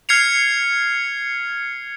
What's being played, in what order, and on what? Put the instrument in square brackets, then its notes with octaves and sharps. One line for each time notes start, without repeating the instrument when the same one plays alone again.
[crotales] F6 G#6 C7 C#7 F7